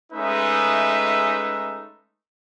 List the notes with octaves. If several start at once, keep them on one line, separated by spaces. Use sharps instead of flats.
G#3 A3 C#4 D#4 B4 E5